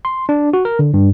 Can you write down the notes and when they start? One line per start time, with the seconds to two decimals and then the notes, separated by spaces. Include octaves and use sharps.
0.05 C6
0.29 D4
0.53 F#4
0.65 A#4
0.79 D3
0.94 G2